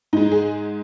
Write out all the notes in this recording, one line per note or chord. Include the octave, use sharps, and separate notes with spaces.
G#2 G#3 D#4
G#4